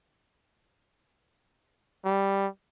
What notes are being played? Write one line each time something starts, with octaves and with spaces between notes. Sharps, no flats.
G3